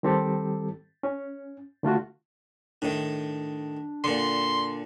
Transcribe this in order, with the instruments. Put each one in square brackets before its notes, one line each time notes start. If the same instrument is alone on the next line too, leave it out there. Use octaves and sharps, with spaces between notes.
[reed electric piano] D#3 G3 C4 G4 A4
C#4
D3 A3 F4 F#4
[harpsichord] A2 D#3 [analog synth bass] D4
[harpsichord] A#2 D3 [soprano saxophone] C6